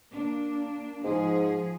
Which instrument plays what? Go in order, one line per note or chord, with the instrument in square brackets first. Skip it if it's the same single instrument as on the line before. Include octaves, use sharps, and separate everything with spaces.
[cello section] A#3 D4
[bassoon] G#2 [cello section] F3 G#4